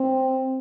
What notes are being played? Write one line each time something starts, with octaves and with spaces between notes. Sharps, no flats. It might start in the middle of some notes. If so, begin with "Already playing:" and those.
Already playing: C4